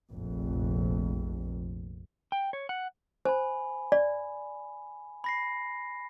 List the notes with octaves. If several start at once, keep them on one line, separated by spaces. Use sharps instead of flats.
F1 A#1 F2
G5
C#5
F#5
C5 G#5 B5
D5
B5 A#6 C7